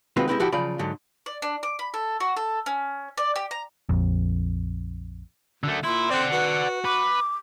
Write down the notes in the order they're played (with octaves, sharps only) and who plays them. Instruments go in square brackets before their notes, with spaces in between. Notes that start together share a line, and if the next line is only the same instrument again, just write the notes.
[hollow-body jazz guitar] D#3 G#3 C4 F4 F#4 B4
G#3 A#3 C4 E4 G4 B4
D3 F3 E4 F#4 G4
C#3 F3 F#3 F4 D5 B5
G#2 D3 F#3
[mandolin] D5
D4
D6
B5
A4
F#4
A4
C#4
D5
G4
A#5
[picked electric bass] A#1 F2
[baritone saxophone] F#2 [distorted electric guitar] D3 A3
[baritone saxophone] A#2 [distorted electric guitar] E4 [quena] C6
[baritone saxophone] C4 [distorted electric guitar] D5 F#5
[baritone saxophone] F#4 [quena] B4
[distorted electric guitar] B4 [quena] D6